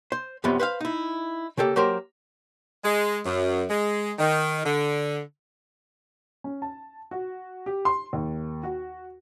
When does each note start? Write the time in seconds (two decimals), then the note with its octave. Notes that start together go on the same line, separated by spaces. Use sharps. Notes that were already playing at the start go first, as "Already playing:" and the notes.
0.12 C5
0.44 C2 F#2 C3 F3 B3
0.60 B4 C5 E5 F5
0.81 D#4 E4
1.57 C#3 A#3 G4 A4
1.76 F#3 A#3 G4 A#4 C5
2.84 G#3
3.25 F#2
3.70 G#3
4.19 D#3
4.65 D3
6.44 C#4
6.62 A5
7.11 F#4
7.66 G4
7.85 C6
8.13 D#2
8.63 F#4